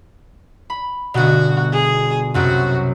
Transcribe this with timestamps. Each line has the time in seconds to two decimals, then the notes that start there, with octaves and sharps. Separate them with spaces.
0.70 B5
1.14 G1 B2 F#4
1.72 G#4
2.34 C2 F#2 C3 F#4